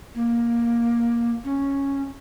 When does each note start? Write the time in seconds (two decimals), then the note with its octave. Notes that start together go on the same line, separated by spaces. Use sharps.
0.15 A#3
1.44 C#4